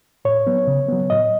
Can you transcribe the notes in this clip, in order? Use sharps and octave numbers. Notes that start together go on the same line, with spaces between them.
A2 C#5
F#3 B3
C#3
F#3 B3
A2 D#5